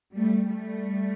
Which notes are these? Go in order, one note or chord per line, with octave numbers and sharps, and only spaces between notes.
G3 A3
G3 A3